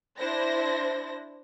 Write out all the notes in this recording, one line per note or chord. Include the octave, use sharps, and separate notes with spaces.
D4 E4 C5 A#6